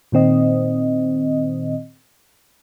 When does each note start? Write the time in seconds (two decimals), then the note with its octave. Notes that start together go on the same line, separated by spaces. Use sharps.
0.12 A#2 D#3 C4 D#5